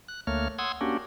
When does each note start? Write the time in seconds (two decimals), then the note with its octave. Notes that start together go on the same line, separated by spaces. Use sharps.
0.08 F#6
0.27 D2 A3 A#3 C#5 F6
0.59 F#5 C6 D#6 E6 G#6
0.81 A#3 C#4 D4 F#4 G4